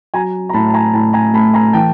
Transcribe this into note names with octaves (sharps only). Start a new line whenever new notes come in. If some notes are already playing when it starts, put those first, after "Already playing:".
F#3 G#5 A#5
A#5
A2 A5 B5
A5
G#5 A#5
A2 A5 B5
G#5 A#5
A3 A5 B5
G#5 A#5
E3 G5 A5